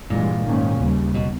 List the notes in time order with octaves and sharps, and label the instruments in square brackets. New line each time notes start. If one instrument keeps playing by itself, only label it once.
[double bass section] G2 E3 G#3 [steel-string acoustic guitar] A#2
[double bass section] G#2 D#3 A#3 C#4
D#2 C#3 G3
[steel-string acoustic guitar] B2